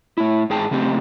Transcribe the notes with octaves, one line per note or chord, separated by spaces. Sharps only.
A2 E4
G#2 G#4 G5 A5
C#3 A3 C4 G4